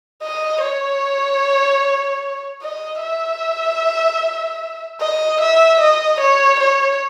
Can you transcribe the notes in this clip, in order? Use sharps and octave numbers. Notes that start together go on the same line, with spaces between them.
D#5
C#5
D#5
E5
D#5
E5
D#5
C#5
C#5